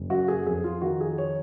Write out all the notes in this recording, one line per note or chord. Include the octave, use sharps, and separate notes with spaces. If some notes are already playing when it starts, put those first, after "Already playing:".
Already playing: F#1
F#2 F#4
G#4
F2 G#4
F4
D#3 F#4
G#4
C#5